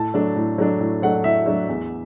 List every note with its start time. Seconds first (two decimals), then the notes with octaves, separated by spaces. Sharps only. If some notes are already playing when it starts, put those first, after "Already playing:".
Already playing: A2 A5
0.14 F#3 A3 D4
0.36 A2
0.58 F#3 A3 D4
0.80 A2
1.02 F#3 A3 D4 F#5
1.24 A2 E5
1.46 F#3 A3 D4
1.69 E2